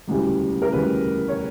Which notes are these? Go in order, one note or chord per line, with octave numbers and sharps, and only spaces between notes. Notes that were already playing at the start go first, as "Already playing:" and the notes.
E1 D2 C#3 E3 G3
A#4
E1 D2 C#3 E3 G3 B4
C#5